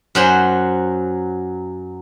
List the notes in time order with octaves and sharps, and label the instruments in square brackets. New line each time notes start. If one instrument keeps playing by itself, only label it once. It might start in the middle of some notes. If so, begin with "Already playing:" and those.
[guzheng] F#2 F#3 C5